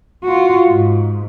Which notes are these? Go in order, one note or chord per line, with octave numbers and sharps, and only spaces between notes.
F4 F#4
G#2